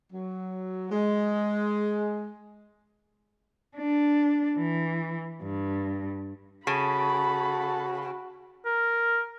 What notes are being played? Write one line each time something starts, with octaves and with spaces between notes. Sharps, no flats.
F#3
G#3
D4
E3
G2
C#3 F#4 A4 B5
A#4